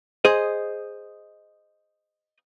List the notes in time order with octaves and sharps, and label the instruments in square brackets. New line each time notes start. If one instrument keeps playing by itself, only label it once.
[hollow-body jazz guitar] G#4 C5 D#5